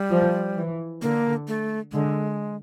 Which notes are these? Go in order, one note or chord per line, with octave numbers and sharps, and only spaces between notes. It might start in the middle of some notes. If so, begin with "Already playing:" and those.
Already playing: G3
F3
E3
D3 A#3
A3
D3 G#3